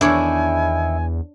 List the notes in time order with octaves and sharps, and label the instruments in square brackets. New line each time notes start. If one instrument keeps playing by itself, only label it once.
[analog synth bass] E2 [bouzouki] D#3 E4 [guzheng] D4 C#5 [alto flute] G#5